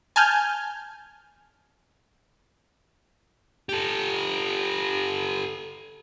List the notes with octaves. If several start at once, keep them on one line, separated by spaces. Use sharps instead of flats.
G#5 A5 F6 G6
G4 A4